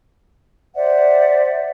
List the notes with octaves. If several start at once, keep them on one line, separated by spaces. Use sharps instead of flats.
C5 D5 E5 F#5